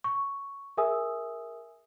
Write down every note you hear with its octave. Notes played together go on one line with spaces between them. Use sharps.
C#6
G#4 A#4 E5 G#5 D#6 E6